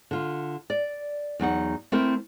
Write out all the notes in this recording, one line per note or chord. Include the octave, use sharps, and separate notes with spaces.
D3 F4
D5
E2 F#3 D#4 F#5
A3 C4 E4 A#4